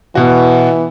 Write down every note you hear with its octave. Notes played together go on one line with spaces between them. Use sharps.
B2 E3 F#4